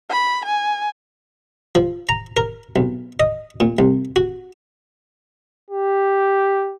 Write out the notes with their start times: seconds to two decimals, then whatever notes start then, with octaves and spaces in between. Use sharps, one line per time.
0.11 B5
0.45 G#5
1.75 F3
2.09 A#5
2.37 A#4
2.76 B1
3.20 D#5
3.60 A#2
3.79 C2
4.16 F#4
5.70 G4